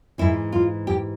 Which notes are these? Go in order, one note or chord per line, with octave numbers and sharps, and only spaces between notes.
G#2 E3 E4
F4
G4